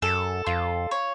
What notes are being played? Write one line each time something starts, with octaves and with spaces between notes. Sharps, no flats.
F#2 A4
F2 F4
C#5